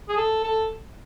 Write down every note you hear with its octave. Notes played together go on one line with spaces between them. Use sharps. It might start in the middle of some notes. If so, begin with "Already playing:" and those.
G#4
A4
A4